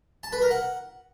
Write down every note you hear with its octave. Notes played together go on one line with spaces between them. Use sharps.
A5
B4
A#4
F#5